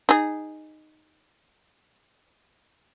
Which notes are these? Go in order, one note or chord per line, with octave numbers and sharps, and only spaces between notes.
D#4 G#4